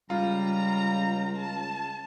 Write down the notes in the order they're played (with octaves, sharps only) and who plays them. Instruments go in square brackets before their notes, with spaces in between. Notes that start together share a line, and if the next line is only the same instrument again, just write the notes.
[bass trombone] C#2 [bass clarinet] G3 [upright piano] F4 [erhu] A#5
[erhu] A5